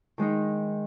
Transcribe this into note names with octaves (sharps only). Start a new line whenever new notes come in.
D#3 G#3 D#4